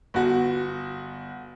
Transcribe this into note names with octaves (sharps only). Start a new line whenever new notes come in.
G1 F#4